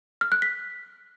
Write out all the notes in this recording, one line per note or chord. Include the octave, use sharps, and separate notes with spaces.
F6
F#6
B6